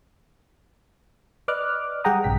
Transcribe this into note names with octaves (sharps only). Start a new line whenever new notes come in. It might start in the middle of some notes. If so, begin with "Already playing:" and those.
B4 D5 D#5 D6 F6 F#6
G3 G#4 F#5 G5 A#5 D#6
A#1 G2 C3 G5 B6